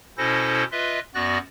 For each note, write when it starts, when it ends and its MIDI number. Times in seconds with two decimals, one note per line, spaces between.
0.18 0.64 47
0.18 0.64 61
0.18 0.64 64
0.18 0.64 69
0.18 0.64 72
0.18 0.64 94
0.72 0.99 65
0.72 0.99 71
0.72 0.99 75
0.72 0.99 76
1.14 1.38 42
1.14 1.38 59
1.14 1.38 66
1.14 1.38 74
1.14 1.38 90
1.14 1.38 94